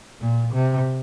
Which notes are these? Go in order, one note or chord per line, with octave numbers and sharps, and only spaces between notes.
A#2
C3